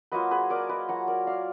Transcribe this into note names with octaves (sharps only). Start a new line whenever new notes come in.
F#3 A#3 F4 B4 D#5
G#4 B4
A#4 D5
B4 D#5
F#3 A#3 F4 F#5 A#5
A#4 D5
D5 F5